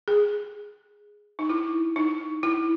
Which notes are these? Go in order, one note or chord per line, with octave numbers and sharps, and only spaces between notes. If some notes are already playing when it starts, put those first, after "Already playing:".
G#4
D#4
E4
D#4
E4